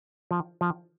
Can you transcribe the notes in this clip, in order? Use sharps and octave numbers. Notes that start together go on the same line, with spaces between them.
F3
F3